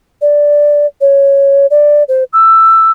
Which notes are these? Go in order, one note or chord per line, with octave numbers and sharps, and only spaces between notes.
D5
C#5
D5
C5
E6